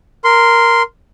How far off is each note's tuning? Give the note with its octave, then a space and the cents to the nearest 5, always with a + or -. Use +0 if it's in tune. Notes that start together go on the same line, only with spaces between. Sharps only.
A#4 +0 C6 -10